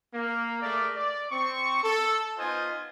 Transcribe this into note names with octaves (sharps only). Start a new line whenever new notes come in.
A#3
A3 G#4 A#4 D5
D5
C4 C#6
A4
B3 D#4 F4 C5 D#5 G#5